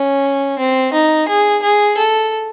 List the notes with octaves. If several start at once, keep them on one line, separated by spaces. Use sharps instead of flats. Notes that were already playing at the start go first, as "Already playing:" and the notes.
Already playing: C#4
C4
D#4
G#4
G#4
A4